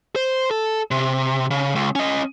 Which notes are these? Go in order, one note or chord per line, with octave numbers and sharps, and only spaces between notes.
C5
A4
C3
C#3
C#2
C#4 D#5